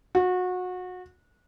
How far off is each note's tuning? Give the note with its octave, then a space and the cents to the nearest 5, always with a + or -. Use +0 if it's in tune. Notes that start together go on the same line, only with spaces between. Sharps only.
F#4 -25